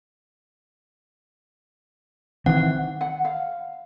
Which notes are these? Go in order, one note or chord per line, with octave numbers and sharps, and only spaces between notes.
D#3 E3 C4 F#5
F#5
F5